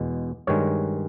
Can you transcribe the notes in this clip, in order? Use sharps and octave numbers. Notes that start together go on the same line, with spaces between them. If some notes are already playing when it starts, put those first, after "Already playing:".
Already playing: E2 B2 G#3
G2 D#3 G#3 C#5